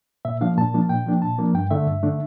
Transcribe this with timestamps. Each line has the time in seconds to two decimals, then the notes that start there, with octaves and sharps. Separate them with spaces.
0.25 A#2 E5
0.41 F3 A#3 D4 F5
0.58 A#2 A5
0.74 F3 A#3 D4
0.89 A#2 G5
1.06 F3 A#3 D4
1.22 A#2 A5
1.38 F3 A#3 D4
1.54 G2 G5
1.71 D3 A3 D4 E5
1.87 G2
2.03 D3 A3 D4